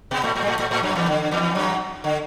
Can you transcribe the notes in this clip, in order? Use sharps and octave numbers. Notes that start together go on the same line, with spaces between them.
B2 B3
A2 A3
A2 A3
G3
A2 A3
A2 A3
A2 A3
F#2 F#3
E2 E3
D3
E2 E3
F#2 F#3
D3